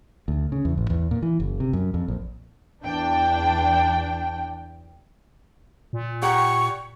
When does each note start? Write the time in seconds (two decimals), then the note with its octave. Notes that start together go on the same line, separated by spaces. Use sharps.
0.28 D2
0.52 C#3
0.65 E2
0.77 A1
0.90 E2
1.11 A#2
1.22 E3
1.40 F#1
1.60 C3
1.73 F#2
1.94 F2
2.08 A#1
2.83 E2 D4 G5
5.93 A#2
6.22 G4 F#5 A#5 C#6